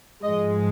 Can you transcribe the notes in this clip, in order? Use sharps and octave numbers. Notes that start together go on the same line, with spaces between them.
G#2 F3 G#3 D#5